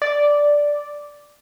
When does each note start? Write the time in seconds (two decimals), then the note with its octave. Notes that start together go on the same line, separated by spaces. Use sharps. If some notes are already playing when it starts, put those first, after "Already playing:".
0.02 D5